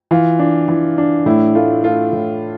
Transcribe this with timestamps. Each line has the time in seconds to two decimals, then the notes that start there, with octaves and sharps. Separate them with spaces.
0.11 E3 F4
0.39 D4
0.68 E3
0.98 D4
1.26 A2 E4
1.55 A3 F4
1.83 A3 F4
2.13 A2